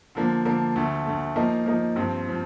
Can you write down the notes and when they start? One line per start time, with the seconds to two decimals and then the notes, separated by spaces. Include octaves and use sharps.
0.15 D3 F3 A#3 D4
0.45 D3 F3 A#3 D4
0.75 D2 D3 A3
1.06 D2 D3 A3
1.36 F3 A#3 D#4
1.66 F3 A#3 D#4
1.96 G2 F3 C4
2.28 F3